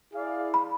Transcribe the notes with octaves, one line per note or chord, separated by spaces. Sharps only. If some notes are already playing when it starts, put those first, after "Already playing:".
E4 G#4 D5 F5
B5